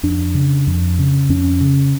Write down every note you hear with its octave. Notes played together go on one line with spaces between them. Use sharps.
F2 D4
C#3
F2
C#3
F2 C#4
C#3